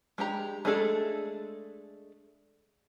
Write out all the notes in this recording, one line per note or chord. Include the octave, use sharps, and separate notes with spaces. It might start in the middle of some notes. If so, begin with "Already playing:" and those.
G#3 D4 G4 A#5
G#3 A3 D4 G#4 A4